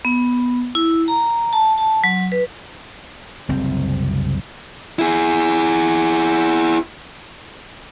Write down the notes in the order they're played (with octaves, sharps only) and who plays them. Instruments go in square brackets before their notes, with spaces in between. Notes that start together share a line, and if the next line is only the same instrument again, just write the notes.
[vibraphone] B3
E4
A#5
A5
A5
F#3
B4
[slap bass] F#1 C2 C4
[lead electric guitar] E4 G#4